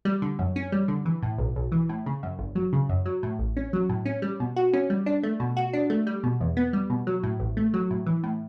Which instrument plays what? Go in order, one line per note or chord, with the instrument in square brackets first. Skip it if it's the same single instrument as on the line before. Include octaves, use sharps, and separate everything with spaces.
[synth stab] G3
D3
F#2
C#4
G3
D3
E3
A2
B1
B1
E3
A2
C#3
F#2
G1
F#3
C#3
F#2
F#3
A2
A1
C#4
F#3
A2
C#4
G3
B2
F#4
C#4
G3
D4
A3
B2
F#4
D4
A3
G3
B2
E2
B3
G3
B2
F#3
A2
A1
A3
F#3
A2
E3
A2